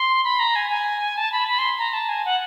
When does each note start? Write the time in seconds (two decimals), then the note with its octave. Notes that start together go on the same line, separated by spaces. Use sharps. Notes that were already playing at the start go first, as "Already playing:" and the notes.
Already playing: C6
0.24 B5
0.39 A#5
0.56 G#5
0.70 G#5
1.17 A5
1.32 B5
1.48 B5
1.58 C6
1.79 A#5
1.94 A5
2.09 G#5
2.25 F#5